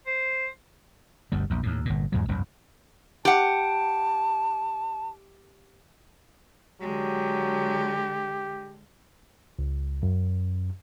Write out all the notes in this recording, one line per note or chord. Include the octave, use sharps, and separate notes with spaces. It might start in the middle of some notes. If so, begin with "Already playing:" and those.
C5
G1 D2 G3
A#1 E2
D#2 A2
G1 A#2
E2 G#2 F#3
F1 C2 G2
G4 F#5 A5
D3 F#3 G#3 G4
C#2
F#2